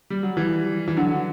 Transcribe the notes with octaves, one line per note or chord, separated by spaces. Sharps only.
G3
F#3
E3 G3
E3
D3 F#3